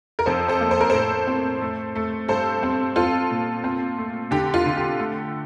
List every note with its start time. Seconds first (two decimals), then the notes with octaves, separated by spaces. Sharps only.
0.19 A#4
0.26 F2 A4 C5
0.48 A4 C5
0.61 A#3
0.71 C5
0.81 A#4
0.90 A2 A4 C5
1.27 C4
1.61 A3
1.96 A3
2.28 G2 A4 C5
2.63 C4
2.96 C4 F4 A4
3.31 A#2
3.64 C4
3.98 A3
4.31 D3 G4
4.54 F4
4.66 D3
4.77 G4
4.99 A3